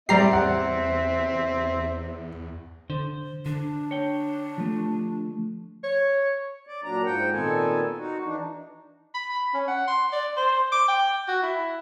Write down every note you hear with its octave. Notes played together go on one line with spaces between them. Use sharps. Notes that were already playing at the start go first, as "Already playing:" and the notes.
A2 G3 C4 G4 D5 E5 A#5 C7
E2 F#5
D3 C5
D3 D4
C#5 G5
F3 A3
C#5
D5
A#2 F#3 D4 A#5
G#2 F3 F#5 G5
A#2 D#3 B3 C4 A4 G#5
D#4 F#4
E3 D4 D#4
B5
C#4
F#5
C6
D5
C5
D6
G5
F#4
E4